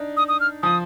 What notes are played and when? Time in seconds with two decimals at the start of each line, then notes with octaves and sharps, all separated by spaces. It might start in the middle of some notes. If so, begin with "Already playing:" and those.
Already playing: D4 D#4
0.17 D#6
0.28 D#6
0.40 F6
0.63 F3 D#6